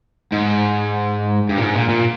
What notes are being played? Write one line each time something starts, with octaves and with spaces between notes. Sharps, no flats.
G#2
G2
A#2
G#2
A#2
A#2